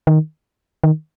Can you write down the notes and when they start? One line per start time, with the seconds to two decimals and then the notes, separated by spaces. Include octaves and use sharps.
0.07 D#3
0.84 D#3